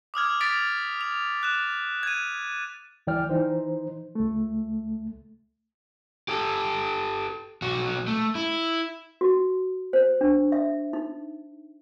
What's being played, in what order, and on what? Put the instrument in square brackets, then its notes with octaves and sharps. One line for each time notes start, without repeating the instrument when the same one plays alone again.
[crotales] D6 D#6 F6 G#6
A6 B6 D7 F7
F7
F#6 E7
G#6 D#7
[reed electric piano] C#2 E3 D5 G5 F6
E3 D#4 C5
C#2 A3
[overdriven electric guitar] G4 A4
B1 F#4
A3
E4
[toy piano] F#4
C5
D4
E5
D#4